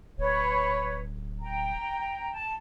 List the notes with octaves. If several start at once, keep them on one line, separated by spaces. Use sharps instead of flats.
D1 B4 C#5
G5 A#5
A5